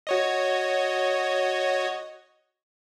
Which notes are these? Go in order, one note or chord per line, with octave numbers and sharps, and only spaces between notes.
F#4 C#5 D#5